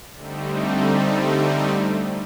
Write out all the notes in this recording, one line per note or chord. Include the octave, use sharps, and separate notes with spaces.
D3 G3 A3 C4 D#4